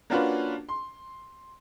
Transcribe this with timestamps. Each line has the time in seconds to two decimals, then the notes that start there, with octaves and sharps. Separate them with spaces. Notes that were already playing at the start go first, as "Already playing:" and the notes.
0.10 A#3 C#4 D4 F4 F#4 B4
0.69 C6